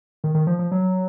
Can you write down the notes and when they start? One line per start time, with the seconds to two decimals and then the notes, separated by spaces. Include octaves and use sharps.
0.24 D#3
0.35 D#3
0.47 F3
0.59 F3
0.72 F#3